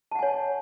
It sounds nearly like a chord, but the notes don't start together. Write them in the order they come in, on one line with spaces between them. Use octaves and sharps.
A5 F#5 G#5 C#5